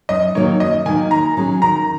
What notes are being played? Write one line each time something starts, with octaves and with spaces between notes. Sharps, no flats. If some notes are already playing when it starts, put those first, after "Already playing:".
F#2 D#5
D#3 F#3 A#3 D#4 C#5
F#2 D#5
D#3 F#3 A#3 D#4 G#5
D#3 A#5
F#3 C#4 G#4
D#3 A#5